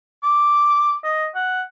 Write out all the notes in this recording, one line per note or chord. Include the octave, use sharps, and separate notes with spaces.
D6
D#5
F#5